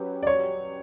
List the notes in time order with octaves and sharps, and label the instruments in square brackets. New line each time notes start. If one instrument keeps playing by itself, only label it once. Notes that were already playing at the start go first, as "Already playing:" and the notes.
Already playing: [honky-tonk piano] F#3 C#4 G4 B4
[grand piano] D5
C#5